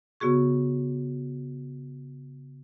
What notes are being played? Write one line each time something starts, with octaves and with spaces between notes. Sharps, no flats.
C#3 B3 F#4 G#4 C#6